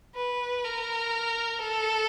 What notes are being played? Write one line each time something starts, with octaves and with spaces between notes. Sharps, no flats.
B4
A#4
A4